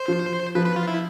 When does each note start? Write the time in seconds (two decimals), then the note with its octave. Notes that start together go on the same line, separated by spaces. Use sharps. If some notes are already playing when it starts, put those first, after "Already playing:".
Already playing: C5
0.08 F3 F4
0.55 F3 F4 B4
0.66 B4
0.76 F4
0.87 E4